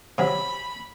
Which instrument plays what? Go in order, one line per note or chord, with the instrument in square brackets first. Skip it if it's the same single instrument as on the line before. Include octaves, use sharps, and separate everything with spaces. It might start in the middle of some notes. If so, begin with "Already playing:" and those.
[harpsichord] C3 F#3 [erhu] B5